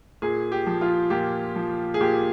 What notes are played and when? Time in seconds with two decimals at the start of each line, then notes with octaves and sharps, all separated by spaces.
0.22 A#2 G#4
0.52 G4
0.66 F3
0.81 F4
1.10 A#2 G4
1.56 F3
1.94 G#4
2.01 A#2 G4